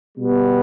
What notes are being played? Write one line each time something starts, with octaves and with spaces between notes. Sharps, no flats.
B2 G3 B3